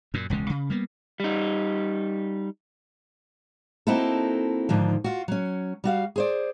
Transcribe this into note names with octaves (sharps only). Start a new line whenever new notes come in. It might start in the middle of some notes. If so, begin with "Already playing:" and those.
F#2 A#2
E1 C#2 C#3 G#3
C#3
G3 A#3 B3
G3 D#4
A#3 C4 D#4 E4 F#4 A4
G#2 D3 D#3 F3
F4 F#4
F#3 C#4
G3 F#4 F5
G#4 C5 D5